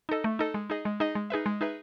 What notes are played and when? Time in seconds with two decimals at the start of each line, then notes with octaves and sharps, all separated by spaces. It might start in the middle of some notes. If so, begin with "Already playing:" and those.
0.09 D#4 A4 D#5
0.24 A3
0.39 D#4 A4 D#5
0.54 G#3
0.70 D#4 G#4 D#5
0.85 G#3
1.00 D#4 G#4 D#5
1.15 G#3
1.30 D#4 G#4 B4 E5
1.46 G#3
1.61 D#4 G#4 B4 E5